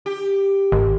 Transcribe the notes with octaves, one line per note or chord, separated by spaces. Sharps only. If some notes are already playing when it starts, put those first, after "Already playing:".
G4
G#1